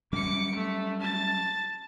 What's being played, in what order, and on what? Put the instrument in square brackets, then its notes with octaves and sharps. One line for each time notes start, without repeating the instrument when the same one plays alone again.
[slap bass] F#3 G3 C#4 [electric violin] D6 C#7
[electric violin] A3
A5 A6